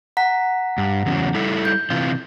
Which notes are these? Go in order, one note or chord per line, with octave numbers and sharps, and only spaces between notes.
F#5 A#5 B6
G2
E2 C#3 F#3
G3 E4 A4
G6
C3 E3 F4